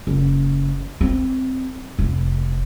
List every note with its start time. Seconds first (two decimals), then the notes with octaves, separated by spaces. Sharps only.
0.07 F#1
1.01 C4
1.99 F1